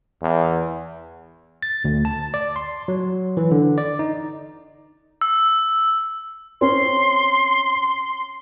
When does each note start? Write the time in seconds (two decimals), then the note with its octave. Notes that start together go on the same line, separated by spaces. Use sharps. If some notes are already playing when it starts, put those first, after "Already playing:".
0.22 E2
1.62 A6
1.85 D2
2.05 A5
2.34 D5
2.56 C6
2.88 F#3
3.37 E3
3.51 D3
3.78 D5
3.99 D#4
5.21 E6
6.61 C4 C#4 C6